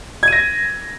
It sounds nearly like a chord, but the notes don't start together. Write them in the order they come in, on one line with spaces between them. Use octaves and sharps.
G#6 D#7 A#6